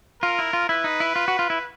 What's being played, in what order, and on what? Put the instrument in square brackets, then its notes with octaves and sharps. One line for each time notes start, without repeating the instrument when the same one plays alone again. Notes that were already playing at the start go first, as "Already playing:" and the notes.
[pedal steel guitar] F4 [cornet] A#4
[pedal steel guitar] E4
F4
[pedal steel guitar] E4 [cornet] B4
[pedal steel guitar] D#4
E4
F4
F#4
F4
E4